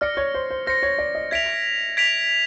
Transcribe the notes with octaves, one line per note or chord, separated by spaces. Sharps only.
D5 F6 A#6 C#7
C#5
C5
C5
C5 F6 A#6 C#7
C#5
D5
D#5
E5 G#6 B6 D7 F7
G#6 B6 D7 F7